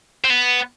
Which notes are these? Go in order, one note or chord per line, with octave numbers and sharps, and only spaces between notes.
C4
B3